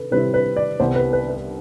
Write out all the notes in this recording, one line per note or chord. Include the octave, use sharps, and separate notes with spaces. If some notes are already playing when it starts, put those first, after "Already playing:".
Already playing: C3 A4 B4
C3 G3 C4 E4 B4
B4
D5
C2 C3 G3 B3 E4 C5
B4
B4
B4